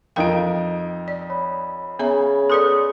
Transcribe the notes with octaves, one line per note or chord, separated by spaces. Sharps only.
F2 D#4 A#4 F5 G5 D7
D5
C#5 B5
C#3 B3 E5 A#5
A4 B4 D5 C6 D#6 C#7